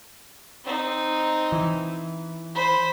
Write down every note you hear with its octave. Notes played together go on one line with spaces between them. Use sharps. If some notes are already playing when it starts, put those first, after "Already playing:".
C4 D#4
E3
C5 B5